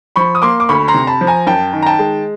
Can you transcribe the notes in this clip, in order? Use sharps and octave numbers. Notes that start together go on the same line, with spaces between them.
F3 B5 C#6
D#6
A#3 C6 D6
D6
D2 B5 C#6
A#5 C6
C3
A5 B5
F3
G#5 A#5
F#2 G5 A5
D#3
A#5
G5 A5
G#3